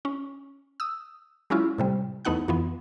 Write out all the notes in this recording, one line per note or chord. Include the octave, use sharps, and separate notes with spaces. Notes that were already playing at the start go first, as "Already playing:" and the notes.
C#4
D#6 E6
F#3 G#3 C#4 E4 F4
A2 C3 G3
E2 A3 B3 D#4 F#5 F#6
F2 E3 B3